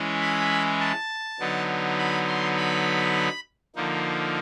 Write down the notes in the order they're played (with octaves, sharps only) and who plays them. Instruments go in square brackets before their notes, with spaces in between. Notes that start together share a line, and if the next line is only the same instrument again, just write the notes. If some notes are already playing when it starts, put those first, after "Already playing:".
Already playing: [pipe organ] E3 G#3 C#4 E4
B5
A5
D3 F#3 B3 D#4
B5
C6
B5
D3 F3 A#3 D#4